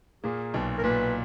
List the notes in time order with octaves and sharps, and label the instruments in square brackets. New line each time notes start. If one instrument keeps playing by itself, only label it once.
[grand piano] A#2 A#3 [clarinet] G#4
[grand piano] B1 B2
[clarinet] A#4
[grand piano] A#2 [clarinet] B4